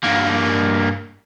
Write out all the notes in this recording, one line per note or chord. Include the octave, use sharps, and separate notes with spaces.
G2 A#3